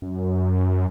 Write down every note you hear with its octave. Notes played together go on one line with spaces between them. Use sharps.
F#2